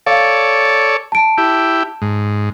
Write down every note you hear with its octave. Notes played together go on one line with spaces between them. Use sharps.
A4 C#5 D5 F5
A5 D7
E4 G4
G#2